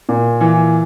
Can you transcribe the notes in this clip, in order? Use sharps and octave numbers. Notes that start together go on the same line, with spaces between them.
A#2
E3